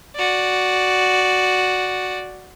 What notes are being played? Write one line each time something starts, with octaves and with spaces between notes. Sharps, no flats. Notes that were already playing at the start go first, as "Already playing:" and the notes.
F#4 D5